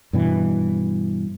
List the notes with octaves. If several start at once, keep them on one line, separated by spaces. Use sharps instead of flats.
G2 B2 E3